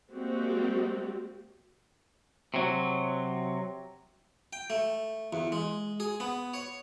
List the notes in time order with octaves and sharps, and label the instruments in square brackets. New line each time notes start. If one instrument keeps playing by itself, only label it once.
[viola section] G3 G#3 A#3 C4 F#4 G4
[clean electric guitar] C3 F#3
[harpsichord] G5
A3
E2
G#3
G#4
B3
C#5